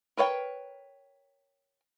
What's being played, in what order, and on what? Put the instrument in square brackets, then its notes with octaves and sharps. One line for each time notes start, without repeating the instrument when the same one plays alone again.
[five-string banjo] A#4 B4 C#5 F#5 G5